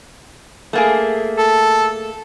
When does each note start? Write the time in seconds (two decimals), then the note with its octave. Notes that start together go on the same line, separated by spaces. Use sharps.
0.73 A3 A#3 G#4
1.39 A4